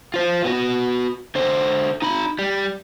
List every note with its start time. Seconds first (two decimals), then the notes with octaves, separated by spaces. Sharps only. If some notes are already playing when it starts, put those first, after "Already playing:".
0.14 F4 C5
0.44 B3 F#4
1.35 D3 C5
2.02 D#4 B5
2.39 G3